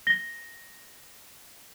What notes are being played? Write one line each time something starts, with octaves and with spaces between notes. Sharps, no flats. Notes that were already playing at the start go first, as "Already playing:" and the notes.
A#6 G7